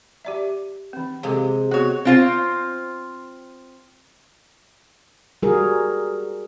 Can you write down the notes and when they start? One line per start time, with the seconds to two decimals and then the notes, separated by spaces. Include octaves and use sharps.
0.25 G4 D5 E5
0.93 E3 C4
1.23 C3 G#3 G4 A4 F5
1.71 B3 F#4 G#4 C#5
2.05 C4 F4 C5
5.43 G3 F#4 G#4 A#4